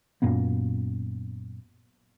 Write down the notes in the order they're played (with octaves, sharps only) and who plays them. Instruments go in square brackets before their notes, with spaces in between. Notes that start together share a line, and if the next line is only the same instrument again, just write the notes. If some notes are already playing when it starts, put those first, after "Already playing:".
[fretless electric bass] F#2 A#2 A#3 B3